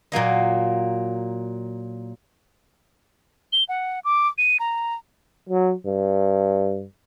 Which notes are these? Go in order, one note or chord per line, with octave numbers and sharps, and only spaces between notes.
A#2 F#3 A#3 D#5
G7
F#5
D6
D#7
A#5
F#3
G2